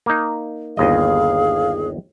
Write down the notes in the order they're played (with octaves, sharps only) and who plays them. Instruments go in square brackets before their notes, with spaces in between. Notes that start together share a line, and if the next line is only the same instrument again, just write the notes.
[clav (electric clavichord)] A#3 D#4
[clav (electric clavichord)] G1 D#2 D#5 [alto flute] G#4 [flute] F5